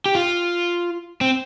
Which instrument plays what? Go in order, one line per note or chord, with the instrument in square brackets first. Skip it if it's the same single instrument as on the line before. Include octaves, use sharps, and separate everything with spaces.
[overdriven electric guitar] G4
F4
C4